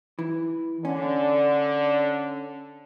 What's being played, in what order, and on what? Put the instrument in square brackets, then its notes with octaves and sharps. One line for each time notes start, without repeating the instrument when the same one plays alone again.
[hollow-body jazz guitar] E3
[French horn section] D3 [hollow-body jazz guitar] C#4